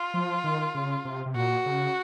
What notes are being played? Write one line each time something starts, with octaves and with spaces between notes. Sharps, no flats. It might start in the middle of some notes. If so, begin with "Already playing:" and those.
Already playing: F4
F3
D#3
C#3
C3
C3
A#2 F#4
C#3